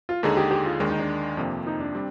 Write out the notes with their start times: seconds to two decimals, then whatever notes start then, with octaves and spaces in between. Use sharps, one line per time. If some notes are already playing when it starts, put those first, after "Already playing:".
0.09 F4
0.23 D#2 D3 G#3 D#4 G#4 A#4
0.37 G4
0.51 G4
0.66 F4
0.80 D#2 D#3 G#3 D4
0.90 D#4
0.99 D4
1.37 F2 C3 F3 A#3
1.67 D#4
1.80 D4
1.95 G3 C4